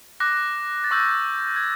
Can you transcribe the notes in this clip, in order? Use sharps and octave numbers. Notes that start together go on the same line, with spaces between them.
D6 F#6 A#6
A6
C#6 E6 G6 A#6
G#6